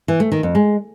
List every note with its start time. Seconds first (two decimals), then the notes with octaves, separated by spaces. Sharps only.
0.08 E3
0.20 A3
0.32 D#3
0.43 F2
0.55 G#3